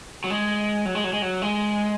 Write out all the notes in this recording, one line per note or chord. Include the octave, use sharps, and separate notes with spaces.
F#3
G#3
F#3
G#3
F#3
G#3
F#3
G#3